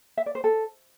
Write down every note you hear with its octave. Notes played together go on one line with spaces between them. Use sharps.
E5
D5
C5
A4